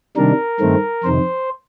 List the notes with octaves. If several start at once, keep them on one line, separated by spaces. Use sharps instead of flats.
C3 D#3 G3 D4 A#4
G2 D#3 A3 C4
F2 C3 D#3 C5